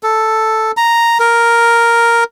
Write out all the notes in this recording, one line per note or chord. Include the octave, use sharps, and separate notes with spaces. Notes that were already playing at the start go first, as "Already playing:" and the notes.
A4
A#5
A#4